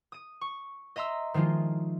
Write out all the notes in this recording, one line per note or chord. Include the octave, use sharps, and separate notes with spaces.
D#6 D#7
C#6
D#5 E5 A#5 C6 E6
D#3 F3 G#3 D#4 F4